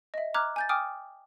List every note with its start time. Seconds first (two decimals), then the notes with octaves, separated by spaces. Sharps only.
0.14 D#5 E5
0.34 A#5 D6 F6 F#6 G#6
0.56 G#5 G6 A6
0.69 G5 G#5 D6 D#6 F6